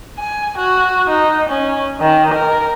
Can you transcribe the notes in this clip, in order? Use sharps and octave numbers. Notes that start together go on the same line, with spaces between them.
G#5
F#4
D#4
C#4
D#3
A#4